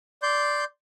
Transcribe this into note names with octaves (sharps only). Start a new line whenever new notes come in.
D5 C6 G6